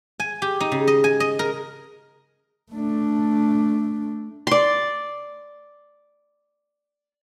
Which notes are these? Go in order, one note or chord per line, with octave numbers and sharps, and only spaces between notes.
G#5
G4
D#4
C#3
D#5
G#5
D#5
A#4
A3 D4
D5 C6